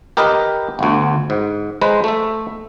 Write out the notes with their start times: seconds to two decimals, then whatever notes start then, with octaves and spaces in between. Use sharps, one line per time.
0.17 G4 A#4 B4 D#5
0.79 G1 D2
1.30 G#2
1.81 G#3 B4 C5 A#5
2.04 A3 E5